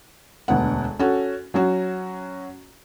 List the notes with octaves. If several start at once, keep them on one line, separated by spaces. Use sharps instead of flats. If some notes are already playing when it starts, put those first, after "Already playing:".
E1 D2 B3 F#5
C#4 F#4 A4
F#3 C#4 F#4